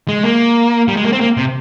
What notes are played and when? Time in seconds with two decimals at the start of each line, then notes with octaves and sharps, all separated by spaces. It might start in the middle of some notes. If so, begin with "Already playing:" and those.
0.08 G#3
0.23 A#3
0.88 G3
0.97 G#3
1.04 A#3
1.13 C4
1.21 A#3
1.37 C3